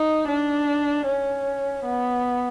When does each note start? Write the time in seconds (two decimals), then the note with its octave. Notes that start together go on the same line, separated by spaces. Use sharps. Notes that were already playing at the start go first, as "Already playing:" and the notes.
Already playing: D#4
0.28 D4
1.06 C#4
1.84 B3